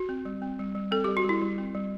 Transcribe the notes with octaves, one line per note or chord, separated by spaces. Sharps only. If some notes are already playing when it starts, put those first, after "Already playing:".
Already playing: F#4
C4
G3
C4
G3
G3
C4 A4
G3 G4
F#4
G3 E4
G3
C4
G3